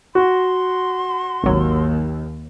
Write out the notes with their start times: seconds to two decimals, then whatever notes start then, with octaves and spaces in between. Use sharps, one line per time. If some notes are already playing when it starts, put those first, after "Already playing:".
0.15 F#4 C6
1.44 G#1 D#2 F#3